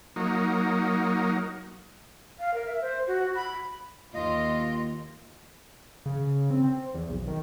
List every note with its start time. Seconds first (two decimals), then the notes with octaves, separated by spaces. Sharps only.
0.16 F#3 A#3 D#4
2.40 F5
2.54 A#4
2.67 E5
2.81 C5
3.08 F#4
3.35 B5
4.14 D#2 F4 D#5
6.06 C#3
6.51 C4
6.64 C4
6.94 E2
7.10 B1
7.28 D#3